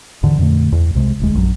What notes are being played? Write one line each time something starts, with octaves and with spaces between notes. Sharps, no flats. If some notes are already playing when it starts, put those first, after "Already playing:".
D#2 G#2 D3 E3
F2 A#2 D3 A3
E2
C2 C3 G#3
E1 D2 G#3
A#1 F#2 F#3